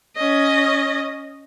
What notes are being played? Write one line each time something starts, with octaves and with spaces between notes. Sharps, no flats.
C#4 D#5